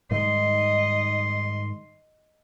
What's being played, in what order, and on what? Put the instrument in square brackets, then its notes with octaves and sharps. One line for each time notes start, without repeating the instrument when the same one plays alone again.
[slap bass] G#2 D#3 G3 [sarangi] D#5 [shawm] C6